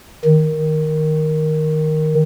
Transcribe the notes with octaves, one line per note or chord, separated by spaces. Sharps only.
D#3